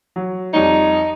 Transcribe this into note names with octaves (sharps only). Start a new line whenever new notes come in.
F#3
F2 G3 D#4 C#5